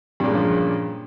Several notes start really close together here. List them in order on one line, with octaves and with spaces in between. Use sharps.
G2 A#2 G#3 C#3 F3